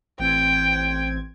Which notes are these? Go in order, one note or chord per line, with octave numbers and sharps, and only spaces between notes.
A1 C4 G5 G#6